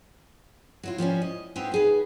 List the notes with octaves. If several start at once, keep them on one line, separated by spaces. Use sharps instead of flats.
F#3 E4 F4
F3 G3 C4 C#4
D#5
B3 C4 D#4 F4 G4 G#4
D#4 G#4 B4